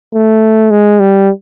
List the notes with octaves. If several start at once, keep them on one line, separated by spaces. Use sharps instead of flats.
A3
G#3
G3